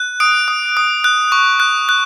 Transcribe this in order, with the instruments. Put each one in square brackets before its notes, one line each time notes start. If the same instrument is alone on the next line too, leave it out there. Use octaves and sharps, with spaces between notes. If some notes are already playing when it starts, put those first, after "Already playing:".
Already playing: [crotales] F#6
D#6 D7
D#6
D#6
F#6
C#6
F#6
F#6